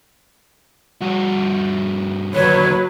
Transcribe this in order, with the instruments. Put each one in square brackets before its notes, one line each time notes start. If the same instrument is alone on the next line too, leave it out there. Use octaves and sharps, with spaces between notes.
[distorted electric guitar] G2 F#4
[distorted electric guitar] D#2 D3 [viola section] F#3 B4 [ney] C#5